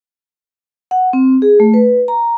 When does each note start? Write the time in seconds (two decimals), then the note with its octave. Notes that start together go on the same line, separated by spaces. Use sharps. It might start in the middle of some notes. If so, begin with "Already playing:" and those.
0.91 F#5
1.13 C4
1.42 G#4
1.60 A3
1.74 B4
2.08 A#5